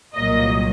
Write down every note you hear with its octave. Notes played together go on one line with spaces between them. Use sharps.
C2 A#2 F#3 A#3 D#5